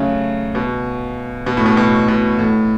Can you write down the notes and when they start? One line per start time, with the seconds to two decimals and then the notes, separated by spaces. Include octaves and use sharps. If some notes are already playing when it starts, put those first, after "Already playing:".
Already playing: C#3 F#3 A3
0.55 B2
1.46 B2
1.57 A2
1.66 B2
1.77 B2
2.08 B2
2.39 A2